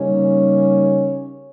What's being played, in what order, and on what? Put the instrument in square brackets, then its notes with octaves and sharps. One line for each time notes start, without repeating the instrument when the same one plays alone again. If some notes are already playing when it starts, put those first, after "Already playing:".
Already playing: [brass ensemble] C#3 G3 A#3 C#4 D#4 C#5